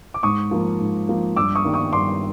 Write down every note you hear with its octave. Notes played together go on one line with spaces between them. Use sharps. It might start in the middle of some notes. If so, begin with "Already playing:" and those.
D6
G#2 C#6 D#6
F3 A#3
G#2
F3 A#3
G2 D6 E6
C#6 D#6
D#3 G3 A#3
C#6 D#6
G2 C6 D6